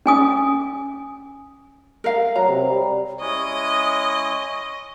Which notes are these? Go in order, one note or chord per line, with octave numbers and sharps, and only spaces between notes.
C#4 G#5 D#6
A#4 D#5 F5
F#3 A#5
C3
G3
G#3 C#4 E4 C#5 D#5 D#6